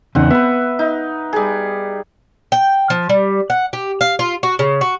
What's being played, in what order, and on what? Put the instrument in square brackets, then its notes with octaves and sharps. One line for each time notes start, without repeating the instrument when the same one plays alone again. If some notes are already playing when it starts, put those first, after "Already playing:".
[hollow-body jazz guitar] E2 C#3 D#4 [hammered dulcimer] C4 F#5
[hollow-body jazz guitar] B3 [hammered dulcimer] B4 E5
[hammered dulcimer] D#4
G3 G#4
[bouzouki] G5
F3
G3
F#5
G4
F5
F4
F#4
C#3
F#4